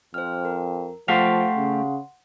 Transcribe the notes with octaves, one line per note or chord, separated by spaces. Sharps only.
F2 C5 F6
A#4
F3 A3 G4 F5 F#5 C6
C#3